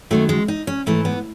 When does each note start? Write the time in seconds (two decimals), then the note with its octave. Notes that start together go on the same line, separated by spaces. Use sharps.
0.11 F#2 D#3 F#3 A3
0.29 G#3
0.48 D#4
0.67 C#4
0.86 G#2 E3 A3
1.05 B3